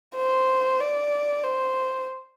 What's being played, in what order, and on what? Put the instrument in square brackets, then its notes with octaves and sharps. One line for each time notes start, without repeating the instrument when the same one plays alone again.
[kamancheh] C5
D5
C5